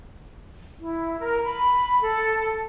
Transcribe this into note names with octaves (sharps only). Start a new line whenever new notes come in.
E4
A#4
B5
A4